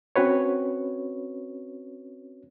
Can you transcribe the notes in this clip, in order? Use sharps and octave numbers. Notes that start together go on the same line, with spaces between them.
C4 C#4 F#4 B4 C#5